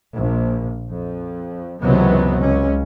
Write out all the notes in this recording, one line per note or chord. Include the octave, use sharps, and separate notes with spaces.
A#1
F2
C#2 F#2 C3 E3 F#3 B3
C#2 C#4